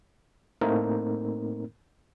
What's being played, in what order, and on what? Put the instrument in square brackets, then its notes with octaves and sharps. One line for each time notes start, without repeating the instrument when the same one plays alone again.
[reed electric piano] A2 A3 A#3 C4 D#4 A#4